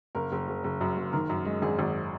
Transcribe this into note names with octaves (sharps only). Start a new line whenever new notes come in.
F#1 A#4
F#1
F#1
F#1
F#2
F#1
D#3 A#4
F#2
G#3
G#1 G#4
G#1